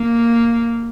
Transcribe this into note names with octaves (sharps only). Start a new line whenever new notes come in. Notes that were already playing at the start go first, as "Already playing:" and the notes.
Already playing: A#3